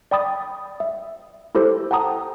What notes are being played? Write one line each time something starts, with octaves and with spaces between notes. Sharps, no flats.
D5 G5 B5 D#6 A6
E5
E4 G4 A4 C5
F#5 G5 A5 A#5 D#6